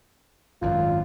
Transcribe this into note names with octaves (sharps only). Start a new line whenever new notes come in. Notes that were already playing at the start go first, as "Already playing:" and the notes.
G#1 F#2 F4